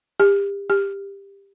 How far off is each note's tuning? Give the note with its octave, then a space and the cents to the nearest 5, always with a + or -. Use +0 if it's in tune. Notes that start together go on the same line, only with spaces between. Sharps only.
G4 +30
G4 +15